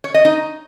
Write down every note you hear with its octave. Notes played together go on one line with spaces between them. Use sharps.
C#5
D#5
D#4